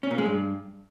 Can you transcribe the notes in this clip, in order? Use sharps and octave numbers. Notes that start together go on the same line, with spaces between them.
C#4
A#2
G#3
G2